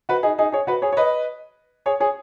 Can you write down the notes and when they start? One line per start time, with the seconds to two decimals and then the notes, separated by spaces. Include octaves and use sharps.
0.09 F#4 B4
0.23 D#4 G#4
0.39 D#4 G#4
0.52 G#4 C#5
0.67 F#4 B4
0.82 G#4 C#5
0.92 C#5
0.97 B4 D#5
1.86 G#4 C#5
2.00 G#4 C#5